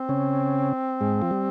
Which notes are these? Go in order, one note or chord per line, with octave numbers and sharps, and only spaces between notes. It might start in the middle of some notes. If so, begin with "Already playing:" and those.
Already playing: C4
C#3 C#4
G#2 G#3
F3
G3